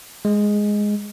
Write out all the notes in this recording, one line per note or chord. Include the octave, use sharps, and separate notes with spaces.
G#3